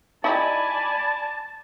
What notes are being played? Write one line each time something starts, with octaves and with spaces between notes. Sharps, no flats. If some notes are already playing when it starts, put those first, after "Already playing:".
D#4 E4 G4 D5 G#5 A5 B5